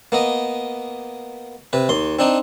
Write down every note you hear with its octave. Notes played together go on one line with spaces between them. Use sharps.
A#3 B3 D#5
C3 B4
D#2 C6
C4 D4 D#4